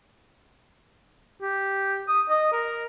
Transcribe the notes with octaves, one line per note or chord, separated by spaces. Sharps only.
G4
D#6
D#5
A#4